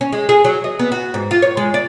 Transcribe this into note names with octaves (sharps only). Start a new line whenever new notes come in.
C#4
G#3
G#4
F#3
D#5
B3
F#4
G#2
F4
C#5
G#3
D5